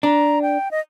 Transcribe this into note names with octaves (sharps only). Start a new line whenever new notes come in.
D4 A#5
G5
D#5